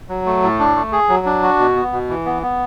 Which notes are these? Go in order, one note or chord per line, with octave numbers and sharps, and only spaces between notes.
F#3
A3
A2
D4
A3
G#4
F#3
D4
F#4
B2
B3
B2
E3
B3
B3